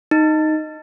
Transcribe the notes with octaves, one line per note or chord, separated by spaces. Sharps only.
D#4